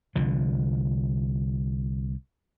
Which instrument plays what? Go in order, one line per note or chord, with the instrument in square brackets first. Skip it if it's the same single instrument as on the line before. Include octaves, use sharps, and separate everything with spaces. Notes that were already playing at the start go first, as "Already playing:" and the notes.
[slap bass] C2 D3 F3